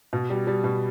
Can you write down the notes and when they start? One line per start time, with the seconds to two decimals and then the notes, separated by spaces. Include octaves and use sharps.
0.13 B2
0.30 G3
0.47 G3
0.64 B2